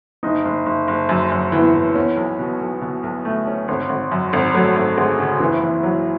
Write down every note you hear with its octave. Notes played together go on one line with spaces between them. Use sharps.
F#1 D#4
F#1
F#1
F#1
F#2
F#2
E3 B3
E3
B3 C#4
B1
B2
B1
B2
B1
A3
C#4
G#1
G#1
F#2
G#1
F#3 A3
G#1
G#1 G#3
C#3
F#1 E3
F#1
F#3